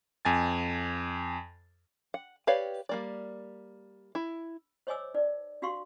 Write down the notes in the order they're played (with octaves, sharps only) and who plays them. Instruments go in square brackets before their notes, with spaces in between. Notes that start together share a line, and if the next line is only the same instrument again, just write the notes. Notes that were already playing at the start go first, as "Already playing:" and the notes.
[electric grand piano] F2 G#5 A6
[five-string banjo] F#5
G4 B4 C#5 D5 F5
G3 A#3 D5
E4
[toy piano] C5 C#5 D#5 G#5 D6 E6
D#4 D5
D4 F#4 G4 F5 C6 C#6